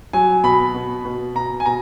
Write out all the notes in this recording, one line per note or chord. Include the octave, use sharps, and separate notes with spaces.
F#3 G#5
B2 B5
B2
B2
B2 A#5
G#5
B2 A#5